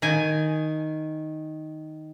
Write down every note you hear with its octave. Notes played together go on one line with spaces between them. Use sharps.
D#3 G#5